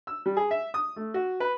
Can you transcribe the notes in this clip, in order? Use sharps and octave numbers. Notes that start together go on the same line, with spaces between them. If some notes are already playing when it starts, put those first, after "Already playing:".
E6
G3
G#4
E5
D#6
A3
F#4
B4